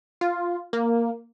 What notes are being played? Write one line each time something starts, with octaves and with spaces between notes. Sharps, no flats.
F4
A#3